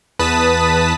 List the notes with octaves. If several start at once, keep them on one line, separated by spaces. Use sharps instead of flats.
E2 B4 A5 D#6 B6